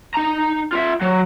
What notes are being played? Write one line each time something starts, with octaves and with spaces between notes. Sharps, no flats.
D#4 A#5
F4 E5
F#3